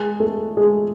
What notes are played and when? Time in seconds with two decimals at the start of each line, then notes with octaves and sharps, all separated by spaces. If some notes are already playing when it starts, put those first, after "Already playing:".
Already playing: G#3 G#4
0.20 A3 A4
0.57 G#3 G#4